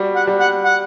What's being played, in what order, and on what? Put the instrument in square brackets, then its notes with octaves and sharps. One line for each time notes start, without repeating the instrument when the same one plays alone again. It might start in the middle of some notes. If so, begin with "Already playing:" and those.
Already playing: [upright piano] G3 F#4
[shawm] F#5
[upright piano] G3
[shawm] F#5
F#5